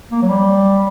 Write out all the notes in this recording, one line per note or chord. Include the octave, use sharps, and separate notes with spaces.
A#3
F#3
G3